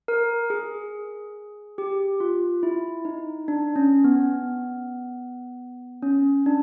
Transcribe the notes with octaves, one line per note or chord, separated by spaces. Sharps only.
A#4
G#4
G4
F4
E4
D#4
D4
C#4
B3
C#4
D4